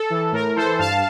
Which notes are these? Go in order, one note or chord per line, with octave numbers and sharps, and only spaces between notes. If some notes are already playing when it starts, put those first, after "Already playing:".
Already playing: A4
E3
A2 A#4
E3 A4 C5
G2 F5 A5